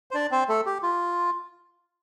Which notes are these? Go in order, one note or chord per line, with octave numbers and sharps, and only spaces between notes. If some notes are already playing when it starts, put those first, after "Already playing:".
C5
D4 D5
C4 C5
A3 A4
G4
F4